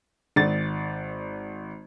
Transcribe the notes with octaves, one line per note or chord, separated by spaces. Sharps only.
G#1 D5 A6